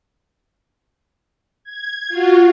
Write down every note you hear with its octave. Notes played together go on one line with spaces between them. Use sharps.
G#6
F4 F#4